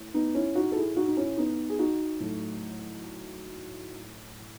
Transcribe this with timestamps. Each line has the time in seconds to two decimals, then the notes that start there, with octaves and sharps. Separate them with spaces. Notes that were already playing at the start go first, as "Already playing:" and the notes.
Already playing: A2 E3
0.14 B3 D#4
0.35 C#4 E4
0.55 D#4 F#4
0.72 A4
0.76 E4 G#4
0.96 D#4 F#4
1.08 D#4
1.17 C#4 E4
1.37 B3 D#4
1.70 G#4
1.79 D#4 F#4
2.20 A2 F#3 A3